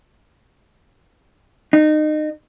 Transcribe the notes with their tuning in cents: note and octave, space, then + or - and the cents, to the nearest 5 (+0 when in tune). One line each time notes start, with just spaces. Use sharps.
D#4 -25